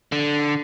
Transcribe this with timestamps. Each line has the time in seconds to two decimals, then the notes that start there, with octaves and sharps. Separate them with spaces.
0.12 D3